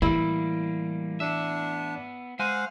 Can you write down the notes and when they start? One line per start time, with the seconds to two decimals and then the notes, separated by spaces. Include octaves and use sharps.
0.02 A2 E3 G3 A#3 E4
1.20 B3 D4 E5
2.39 G#3 C5 F5 F#5 G#5